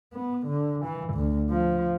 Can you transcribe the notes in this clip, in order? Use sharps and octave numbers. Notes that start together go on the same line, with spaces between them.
B3
D3
E3
D2
F3